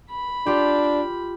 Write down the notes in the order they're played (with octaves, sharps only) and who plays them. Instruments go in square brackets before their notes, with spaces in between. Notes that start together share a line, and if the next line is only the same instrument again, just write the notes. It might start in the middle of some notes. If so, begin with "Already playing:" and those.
[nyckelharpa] B5
[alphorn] D4 [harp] F4 G4